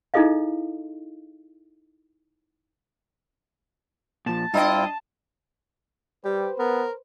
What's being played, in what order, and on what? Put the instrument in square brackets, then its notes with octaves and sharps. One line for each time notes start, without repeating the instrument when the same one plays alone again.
[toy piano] D#4 E4 G#4 A4 D#5 F5
[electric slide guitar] A#2 F3 [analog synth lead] A5
[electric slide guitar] G2 G5 [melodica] C4 E4 F4 [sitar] D4 D#5
[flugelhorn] G3 [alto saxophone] G4 [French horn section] B4 C5
[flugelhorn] B3 [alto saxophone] A#4